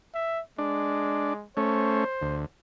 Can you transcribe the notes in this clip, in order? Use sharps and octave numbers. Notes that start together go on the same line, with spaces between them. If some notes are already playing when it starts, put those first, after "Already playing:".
E5
G#3 D4
A3 C#4 C5
D2